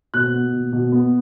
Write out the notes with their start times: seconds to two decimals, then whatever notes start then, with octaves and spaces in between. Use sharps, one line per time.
0.14 B2 F#6
0.33 B3
0.53 B2
0.73 B2
0.92 B3